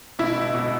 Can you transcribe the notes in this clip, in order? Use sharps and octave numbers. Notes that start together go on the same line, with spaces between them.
B2 E4
B2
B2